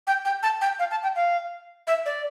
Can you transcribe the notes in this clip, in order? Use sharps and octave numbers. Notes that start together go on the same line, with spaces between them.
G5
G5
A5
G5
F5
A5
G5
F5
E5
D5